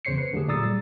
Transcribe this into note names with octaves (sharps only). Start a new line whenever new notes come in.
E2 C#3 C5 C#5 C7 C#7
B4
D3 F#3 A3 G4 G#4
A#2 D5 A#5 D#6 E6 A6
G3